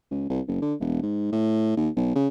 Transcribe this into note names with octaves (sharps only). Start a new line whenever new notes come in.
C#2
C2
F#1
D3
E1
G#2
A2
D#2
B1
C#3